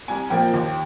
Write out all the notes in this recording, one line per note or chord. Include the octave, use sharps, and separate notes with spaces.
C2 G#5
A#2 F3 A#3 G5
D#2